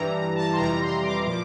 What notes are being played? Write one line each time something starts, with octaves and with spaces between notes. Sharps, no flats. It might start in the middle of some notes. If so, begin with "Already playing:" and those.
Already playing: G2 E3 G3 A#5
A#5
A5
C6
F2 C3 E3 G3 A#5
C6
D6
A#2 F3 D6